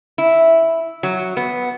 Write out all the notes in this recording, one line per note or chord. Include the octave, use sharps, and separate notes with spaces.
E4
F#3
B3